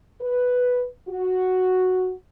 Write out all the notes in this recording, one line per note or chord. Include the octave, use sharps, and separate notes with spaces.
B4
F#4